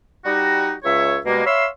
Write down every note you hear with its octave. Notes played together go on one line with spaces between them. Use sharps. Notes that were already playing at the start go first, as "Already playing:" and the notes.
G3 D#4 F#4
C#2 C#5 E5
B2 G3 G#3 A#3
C#5 E5 F5 B5 C6 E6